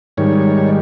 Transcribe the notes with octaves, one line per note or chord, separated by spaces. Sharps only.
G#2 D#3 G3 C#5